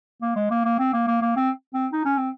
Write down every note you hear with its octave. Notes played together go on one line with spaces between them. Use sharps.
A#3
G#3
A#3
A#3
C4
A#3
A#3
A#3
C4
C4
D#4
C#4
C4